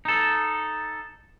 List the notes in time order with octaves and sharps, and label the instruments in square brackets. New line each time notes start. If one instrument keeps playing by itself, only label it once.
[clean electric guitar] D#4 A4